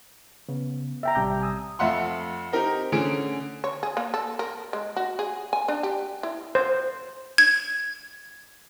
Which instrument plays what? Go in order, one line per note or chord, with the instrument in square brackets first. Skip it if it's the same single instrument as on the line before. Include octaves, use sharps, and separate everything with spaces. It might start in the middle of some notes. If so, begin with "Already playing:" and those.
[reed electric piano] C#3 [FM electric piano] B3
[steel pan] E5 G5 A#5
[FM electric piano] A1 C3 G3 [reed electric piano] A5 D6 G6
[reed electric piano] G#5 D#6 E6
[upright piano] F2 A3 F5 F#5 C6
C4 D#4 G4 A#4
D3 C#4 G#4 D7
[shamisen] C#5
G#4
A#3
A4
A#4
G#3
F#4
G#4
G#5
D4
G4
E4
[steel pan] C5
[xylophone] G#6